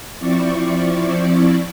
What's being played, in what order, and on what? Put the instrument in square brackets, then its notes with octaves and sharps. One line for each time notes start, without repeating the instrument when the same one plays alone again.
[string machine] F3 C4 E4 D5 C#6